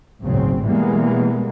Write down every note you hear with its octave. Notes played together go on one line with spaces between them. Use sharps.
G#1 D2 A#2 C#3 F#3 C4
B2 E3 G3 G#3 A#3 B3